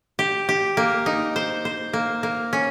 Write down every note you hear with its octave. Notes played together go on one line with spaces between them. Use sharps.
G4
G4
A#3
D#4
C5
C5
A#3
A#3
C#4